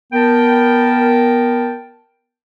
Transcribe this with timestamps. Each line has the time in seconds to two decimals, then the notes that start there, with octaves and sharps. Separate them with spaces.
0.13 B3 A#4 G5 A5